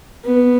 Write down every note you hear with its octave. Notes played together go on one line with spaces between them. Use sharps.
B3